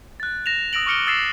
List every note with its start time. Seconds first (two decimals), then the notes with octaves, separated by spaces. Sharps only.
0.20 F#6 A6
0.46 A#6 E7 F7
0.73 D#6 E6 A#6 D7 F#7
0.86 C#6 D6 F6 C#7 D7 G7
1.07 D#6 E6 A6 C7 E7